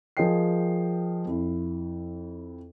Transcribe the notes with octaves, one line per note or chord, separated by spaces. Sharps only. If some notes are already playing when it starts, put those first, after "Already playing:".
F3 G#4 A#4 D#5 G5 C7
F2 E4